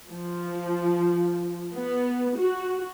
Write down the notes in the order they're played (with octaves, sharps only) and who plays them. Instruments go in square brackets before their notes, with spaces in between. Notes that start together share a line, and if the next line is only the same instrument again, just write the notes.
[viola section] F3
B3
F#4